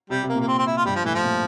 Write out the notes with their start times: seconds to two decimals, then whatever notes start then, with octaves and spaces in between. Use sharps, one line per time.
0.10 C3 G3
0.23 C3
0.29 A#3
0.35 A#2
0.40 A#3
0.48 C4
0.58 C4
0.67 E4
0.77 F4
0.85 G2 G3
0.96 F3
1.04 A2 E3
1.14 F3
1.24 A#2